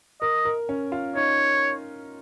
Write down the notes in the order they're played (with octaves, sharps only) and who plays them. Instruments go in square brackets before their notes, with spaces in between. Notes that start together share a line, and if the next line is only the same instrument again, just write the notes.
[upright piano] A#4 [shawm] D#5
[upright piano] A#4
C#4
F4
[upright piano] D#4 [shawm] C#5